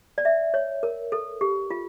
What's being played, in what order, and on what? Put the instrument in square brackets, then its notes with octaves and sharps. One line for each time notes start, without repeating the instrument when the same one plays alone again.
[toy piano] D5
E5
C#5
A#4
A4
G4
F4